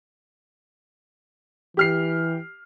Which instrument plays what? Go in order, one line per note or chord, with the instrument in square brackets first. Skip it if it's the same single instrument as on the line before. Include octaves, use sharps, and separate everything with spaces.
[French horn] E3 [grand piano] G4 F6 C7